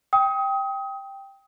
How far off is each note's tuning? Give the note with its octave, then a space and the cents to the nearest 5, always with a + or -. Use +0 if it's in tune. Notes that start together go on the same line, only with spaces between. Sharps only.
G5 +0 D#6 +25